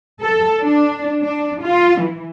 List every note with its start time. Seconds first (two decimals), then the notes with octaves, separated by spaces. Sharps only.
0.22 A4
0.61 D4
1.22 D4
1.62 F4
2.00 E3